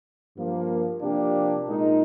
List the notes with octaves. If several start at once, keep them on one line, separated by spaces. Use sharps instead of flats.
G2 F3 A#3
C3 F3 A#3 D4 G4
A#2 G#3 D#4 A#4